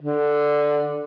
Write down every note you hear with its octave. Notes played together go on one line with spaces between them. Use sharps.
D3